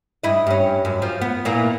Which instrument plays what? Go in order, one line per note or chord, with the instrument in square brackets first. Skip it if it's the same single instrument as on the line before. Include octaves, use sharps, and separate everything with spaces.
[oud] G2 E4 D#5
G2 C#4
F#2
F3
B3
A#2 E3 A#3